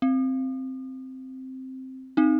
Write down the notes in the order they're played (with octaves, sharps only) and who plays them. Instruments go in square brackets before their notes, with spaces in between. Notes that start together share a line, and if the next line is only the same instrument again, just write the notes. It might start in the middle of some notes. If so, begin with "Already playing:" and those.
[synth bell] C4
C4 D#4